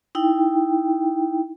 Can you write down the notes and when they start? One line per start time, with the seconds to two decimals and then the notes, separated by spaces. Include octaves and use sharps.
0.15 D#4 E4 G5